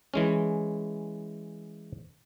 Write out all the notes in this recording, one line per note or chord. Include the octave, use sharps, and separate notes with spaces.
E3 G#3 C#4